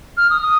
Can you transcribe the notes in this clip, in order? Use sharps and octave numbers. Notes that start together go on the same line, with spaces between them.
F6
D#6
D#6